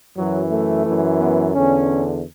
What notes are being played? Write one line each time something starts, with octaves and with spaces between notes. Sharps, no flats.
F#2 E3 F#3
A3
F#2 E3
B3
E2 D3 C#4